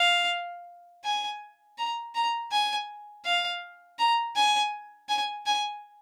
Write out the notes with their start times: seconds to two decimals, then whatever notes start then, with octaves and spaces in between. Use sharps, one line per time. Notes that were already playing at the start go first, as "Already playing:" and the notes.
Already playing: F5
1.05 G#5
1.78 A#5
2.15 A#5
2.52 G#5
3.25 F5
3.99 A#5
4.36 G#5
5.09 G#5
5.46 G#5